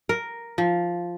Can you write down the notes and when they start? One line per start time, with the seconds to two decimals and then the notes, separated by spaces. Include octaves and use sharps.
0.09 A#4
0.58 F3